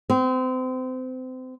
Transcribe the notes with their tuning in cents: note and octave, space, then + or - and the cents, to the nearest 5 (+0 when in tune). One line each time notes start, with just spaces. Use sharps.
C4 -30